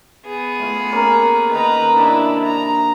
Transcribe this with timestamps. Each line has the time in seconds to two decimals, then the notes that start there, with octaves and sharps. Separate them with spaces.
0.26 B3 G#4
0.59 A3 F4
0.92 A#3 C#4 A#4
1.52 D#3 D#4 B4 A#5
1.97 C3 D4 E4 F#4
2.44 A#5